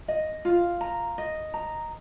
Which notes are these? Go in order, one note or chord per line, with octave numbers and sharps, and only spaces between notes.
D#5
F4
A#5
D#5
A#5